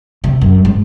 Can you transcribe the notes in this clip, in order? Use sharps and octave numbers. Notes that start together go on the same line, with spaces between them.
C3
F#2
G#2